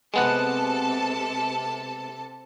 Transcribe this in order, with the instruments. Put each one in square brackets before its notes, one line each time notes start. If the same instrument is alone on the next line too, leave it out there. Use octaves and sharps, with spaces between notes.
[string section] C3 A4 A5 [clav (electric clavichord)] G#3 B3 F#5